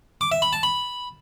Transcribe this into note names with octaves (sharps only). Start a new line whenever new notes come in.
D6
E5
B5
A5
B5